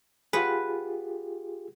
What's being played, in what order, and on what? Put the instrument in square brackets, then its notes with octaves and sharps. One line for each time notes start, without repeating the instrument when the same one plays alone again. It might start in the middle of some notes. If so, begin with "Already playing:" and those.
[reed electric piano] F4 G4 G#4 [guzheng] B4 F#5